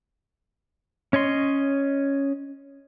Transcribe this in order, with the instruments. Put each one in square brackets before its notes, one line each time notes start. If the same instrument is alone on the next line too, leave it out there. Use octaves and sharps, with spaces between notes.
[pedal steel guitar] C#4 C#5 D#5 C6